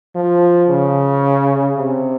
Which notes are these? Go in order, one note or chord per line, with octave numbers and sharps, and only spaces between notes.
F3
C#3
C3